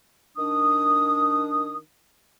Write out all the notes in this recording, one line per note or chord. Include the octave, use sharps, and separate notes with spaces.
D#3 D4 D#6